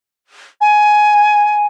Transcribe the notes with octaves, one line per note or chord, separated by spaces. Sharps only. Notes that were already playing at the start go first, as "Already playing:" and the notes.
G#5